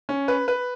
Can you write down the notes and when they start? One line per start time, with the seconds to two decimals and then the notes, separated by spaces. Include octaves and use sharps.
0.09 C#4
0.28 B4
0.48 B4